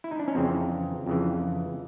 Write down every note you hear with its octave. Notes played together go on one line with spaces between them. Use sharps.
E4
D#4
D4
C#4
F2 C#3 E3 C4
F2 C#3 E3